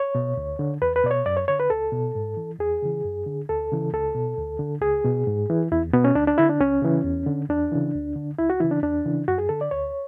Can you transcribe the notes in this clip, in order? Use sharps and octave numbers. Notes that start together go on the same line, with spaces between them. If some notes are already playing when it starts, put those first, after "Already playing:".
Already playing: C#5
B2
D2
D3
E2 B4
B4
B2 D5
C#5
F#2 D5
C#5
D3 C#5
B4
C#2 A4
B2
G#2
E3
E2 G#4
C#3 E3
F#2
D3
D2 A4
C#3 E3
C#2 A4
B2
D2
D3
C#2 G#4
B2
G#2
E3
E2 E4
B2 B3
C#4
D2 D4
D4
D3 E4
D4
C#2 C#4
C#3 E3
E2
D3
E2 D4
C#3 E3
D2
D3
C#2 E4
F#4
C#3 E3 E4
D4
E2 D4
C#3 E3
F#2 F#4
G#4
D3 A4
D5
D2 C#5